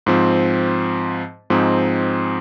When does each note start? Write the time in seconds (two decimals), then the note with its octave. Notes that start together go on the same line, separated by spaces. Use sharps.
0.06 G#2 F3 C4
1.50 G#2 F3 C4 D#4 G#4